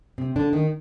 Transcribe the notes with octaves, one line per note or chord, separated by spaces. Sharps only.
C3 C4
D3 D4
D#3 D#4